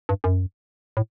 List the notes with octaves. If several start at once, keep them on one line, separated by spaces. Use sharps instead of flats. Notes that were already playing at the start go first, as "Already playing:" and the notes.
G2
F#2
A2